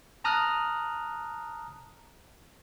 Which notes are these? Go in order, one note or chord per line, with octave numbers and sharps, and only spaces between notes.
A5 A#5 D#6 F6 F#6